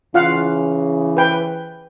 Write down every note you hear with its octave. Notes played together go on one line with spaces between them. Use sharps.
C#3 E3 F4 F5 F#5
B4 G5